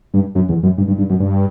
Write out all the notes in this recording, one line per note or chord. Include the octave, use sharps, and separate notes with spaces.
G2
F#2
E2
F#2
G2
G2
G2
F#2
G2